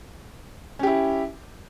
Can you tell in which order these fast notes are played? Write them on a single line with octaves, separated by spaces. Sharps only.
C#4 G4 E4